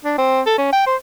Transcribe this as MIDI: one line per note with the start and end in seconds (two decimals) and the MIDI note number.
0.05 0.16 62
0.18 0.41 60
0.46 0.56 69
0.58 0.70 61
0.73 0.83 79
0.86 0.96 72